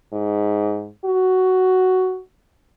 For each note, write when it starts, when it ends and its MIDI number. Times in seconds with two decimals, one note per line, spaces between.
0.13 0.89 44
1.05 2.20 66